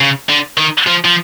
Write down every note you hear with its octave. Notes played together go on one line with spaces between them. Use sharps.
C#3
D3
D#3
F3
F3